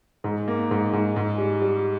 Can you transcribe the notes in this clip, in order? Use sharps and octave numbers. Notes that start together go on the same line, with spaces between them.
G#2
A#3
G#2
G#2
G#2
G3
G3